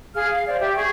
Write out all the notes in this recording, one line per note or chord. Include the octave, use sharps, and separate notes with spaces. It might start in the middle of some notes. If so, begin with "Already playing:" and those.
G#4 F5 F6
F5
C5 D5
G4 E5
G#4 C#6